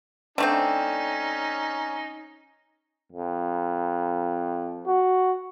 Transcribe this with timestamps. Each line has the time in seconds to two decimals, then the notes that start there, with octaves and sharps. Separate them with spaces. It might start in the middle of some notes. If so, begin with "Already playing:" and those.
0.38 D3 A3 C4 C#4 D#4
3.12 F2
4.88 F#4